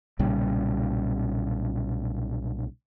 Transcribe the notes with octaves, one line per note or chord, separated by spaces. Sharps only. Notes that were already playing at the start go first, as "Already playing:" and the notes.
B1 A#2 C#3 G3